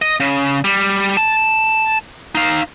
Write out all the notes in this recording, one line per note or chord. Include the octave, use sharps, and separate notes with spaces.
D#5
C#3
G3
A5
D#4 F5